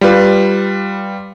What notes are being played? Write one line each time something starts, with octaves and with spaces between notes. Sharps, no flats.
G3 F4 B4